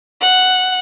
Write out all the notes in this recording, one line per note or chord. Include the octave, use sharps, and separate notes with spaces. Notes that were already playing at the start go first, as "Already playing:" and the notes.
F#5